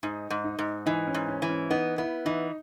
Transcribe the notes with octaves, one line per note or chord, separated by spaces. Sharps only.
G#2 D#4
G#2
D#4
G#2
E3 D#4
C#4
G#2
C#4
E3
C#4
B3 D#4
B3 E4
E3 D#4